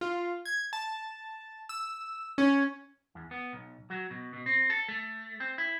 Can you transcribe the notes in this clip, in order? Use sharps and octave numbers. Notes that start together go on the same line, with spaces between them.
F4
G#6
A5
E6
C#4
E2
B3
B1
F#3
B2
B2
C4
A4
A3
C4
E4